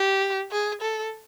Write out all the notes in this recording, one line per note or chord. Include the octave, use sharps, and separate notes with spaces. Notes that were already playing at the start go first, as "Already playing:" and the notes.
Already playing: G4
G#4
A4